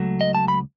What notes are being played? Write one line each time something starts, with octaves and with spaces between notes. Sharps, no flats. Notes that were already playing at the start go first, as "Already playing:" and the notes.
Already playing: C#2 F#3 A3
D#5
A5
B5